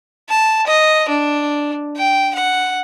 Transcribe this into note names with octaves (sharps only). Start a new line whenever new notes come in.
A5
D#5
D4
G5
F#5